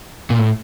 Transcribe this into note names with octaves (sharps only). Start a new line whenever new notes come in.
A#2
A2